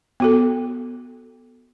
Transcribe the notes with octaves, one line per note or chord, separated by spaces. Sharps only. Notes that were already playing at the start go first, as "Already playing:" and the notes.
B3 F#4 A4